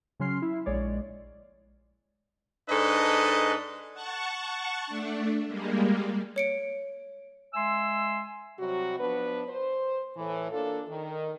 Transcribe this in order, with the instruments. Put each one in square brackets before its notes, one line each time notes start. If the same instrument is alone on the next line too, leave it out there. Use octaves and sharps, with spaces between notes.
[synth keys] C#3 F#3 C#4 C6 F6 C7
E4
A#1 G#3 C#5 D5
[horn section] G#2 D4 A4 B4 D#5
[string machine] F#5 A5 C#6
A3 D4
G3 G#3 A#3
[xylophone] C#5 C#7 D7
[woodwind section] G#3 E5 G#5 C6 E6
[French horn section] C3 F#3 G3 F#4
F3 B3 D4 B4
C5
A2 E3
A#3 D4 F4 A4
D#3